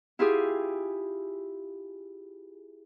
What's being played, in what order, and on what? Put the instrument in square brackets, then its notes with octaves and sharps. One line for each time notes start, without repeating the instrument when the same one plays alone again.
[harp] E4 F4 G4 G#4